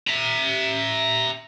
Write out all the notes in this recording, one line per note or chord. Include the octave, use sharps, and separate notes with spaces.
E5 A#5